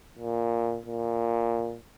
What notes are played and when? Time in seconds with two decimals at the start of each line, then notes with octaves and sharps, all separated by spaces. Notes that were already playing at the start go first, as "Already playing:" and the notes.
0.19 A#2
0.86 A#2